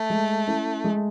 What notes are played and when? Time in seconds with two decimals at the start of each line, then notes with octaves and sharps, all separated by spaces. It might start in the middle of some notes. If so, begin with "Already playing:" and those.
Already playing: A3
0.10 G#3
0.48 C#4 E4
0.84 G#3